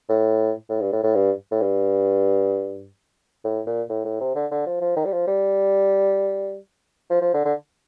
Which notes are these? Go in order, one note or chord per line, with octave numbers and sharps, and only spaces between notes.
A2
A2
G2
A2
A2
G2
A2
G2
A2
A#2
A2
A2
C3
D3
D3
F3
F3
D#3
G3
F3
G3
F3
F3
D3
D3